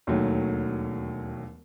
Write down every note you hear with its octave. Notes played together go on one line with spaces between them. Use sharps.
E1 D#2 D#3 F#3 A3